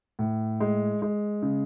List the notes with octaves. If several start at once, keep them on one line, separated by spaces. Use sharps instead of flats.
A2
G#3
G#3
C#3